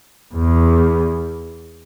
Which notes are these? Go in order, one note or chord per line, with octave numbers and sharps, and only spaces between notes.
E2